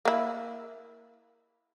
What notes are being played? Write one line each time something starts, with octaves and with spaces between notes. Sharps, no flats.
A#3 E4